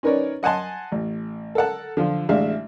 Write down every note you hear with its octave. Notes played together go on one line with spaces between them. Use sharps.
C#4 D#4 A#4 B4 C#5 D5
D#5 F#5 G#5 A5 C6
A1
A4 A#4 F#5 A5
D3 F3 F4
A1 G#3 D4 E5 F5